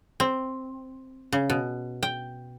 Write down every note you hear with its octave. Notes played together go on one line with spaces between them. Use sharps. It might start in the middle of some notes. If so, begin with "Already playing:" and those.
C4
C#3
B2
G5